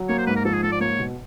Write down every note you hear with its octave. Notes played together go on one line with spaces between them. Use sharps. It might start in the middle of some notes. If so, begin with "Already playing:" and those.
Already playing: F#3
A#3 C#5
C5
G#2 B4
A#4
F3 A4
G#4
G#2 A4
D5
A#3 C#5
B2